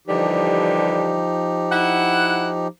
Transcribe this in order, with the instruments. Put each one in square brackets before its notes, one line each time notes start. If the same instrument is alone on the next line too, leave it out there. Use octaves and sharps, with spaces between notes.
[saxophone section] D3 E3 G3 [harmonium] F3 D#4 G4
[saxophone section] E4 F#5